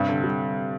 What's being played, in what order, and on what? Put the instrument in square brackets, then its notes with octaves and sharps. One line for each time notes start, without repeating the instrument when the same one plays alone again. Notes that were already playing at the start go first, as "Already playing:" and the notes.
Already playing: [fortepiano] G2 [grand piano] C3 G3
[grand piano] D3
G3